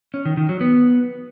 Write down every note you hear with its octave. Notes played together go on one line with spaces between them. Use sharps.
C#4
D#3
D#3
F#3
B3